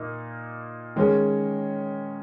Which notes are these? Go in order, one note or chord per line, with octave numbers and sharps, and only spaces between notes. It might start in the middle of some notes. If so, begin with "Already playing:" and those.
Already playing: A#2 A#3 D#4
D#3 G#3 C#4 G#4 C#5